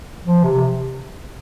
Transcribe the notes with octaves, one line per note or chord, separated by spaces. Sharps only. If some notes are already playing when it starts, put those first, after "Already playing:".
F3
C3